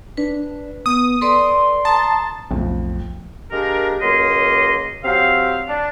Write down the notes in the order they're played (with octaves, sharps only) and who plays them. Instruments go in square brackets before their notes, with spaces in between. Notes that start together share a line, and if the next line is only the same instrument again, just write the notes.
[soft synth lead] D4 [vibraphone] B4
[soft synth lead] B3 [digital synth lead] D#6
[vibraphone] A4 B4 D5 [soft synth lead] C6
[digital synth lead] A5 [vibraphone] A#5 D#6
[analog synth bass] B1 [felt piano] F2 A2
[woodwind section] G#3 A#3 D4 G4 A#4
C#2 F#3 A#3 A#4 D#5 C6
F#3 C4 G4 F5
D4